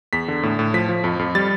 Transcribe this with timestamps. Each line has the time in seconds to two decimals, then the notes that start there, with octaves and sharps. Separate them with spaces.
0.13 E2 B6
0.28 D3
0.43 A2
0.59 A2
0.74 F3 B6
0.89 F3
1.04 F2
1.19 F2
1.35 G3 A6